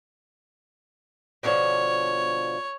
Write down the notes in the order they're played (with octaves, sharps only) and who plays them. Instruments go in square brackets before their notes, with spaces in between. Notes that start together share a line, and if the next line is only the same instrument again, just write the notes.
[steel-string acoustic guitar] B2 D3 F3 [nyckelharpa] C#5